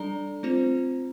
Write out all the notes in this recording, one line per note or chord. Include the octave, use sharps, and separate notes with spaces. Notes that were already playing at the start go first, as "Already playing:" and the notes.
Already playing: G3 D4 A4 D5 A#5
A3 C4 F4 C5